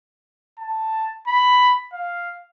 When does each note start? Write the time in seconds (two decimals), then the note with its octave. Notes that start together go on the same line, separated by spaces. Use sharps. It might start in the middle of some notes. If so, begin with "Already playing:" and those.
0.59 A5
1.28 B5
1.93 F5